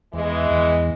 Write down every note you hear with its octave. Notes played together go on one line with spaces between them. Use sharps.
E2 E3 G#3
E2